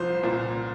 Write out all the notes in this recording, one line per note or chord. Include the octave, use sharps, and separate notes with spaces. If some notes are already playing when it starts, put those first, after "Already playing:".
Already playing: C2 F3 C5
A#2